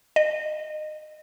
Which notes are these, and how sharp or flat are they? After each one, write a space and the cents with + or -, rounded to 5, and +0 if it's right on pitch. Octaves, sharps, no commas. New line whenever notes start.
D#5 -25